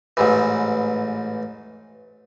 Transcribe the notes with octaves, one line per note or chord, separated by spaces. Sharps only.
A1 G#2 E3